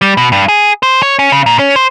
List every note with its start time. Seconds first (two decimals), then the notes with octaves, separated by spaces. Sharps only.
0.02 G3
0.17 B2
0.32 G2
0.49 G#4
0.83 C5
1.03 C#5
1.19 C#4
1.32 C#3
1.46 A#2
1.59 C#4
1.76 C5